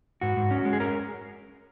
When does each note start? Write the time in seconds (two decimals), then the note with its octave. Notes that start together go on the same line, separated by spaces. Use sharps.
0.21 G#2 F#4
0.37 G#2
0.51 C#4
0.65 G#3
0.73 G#4
0.80 C#4 A#4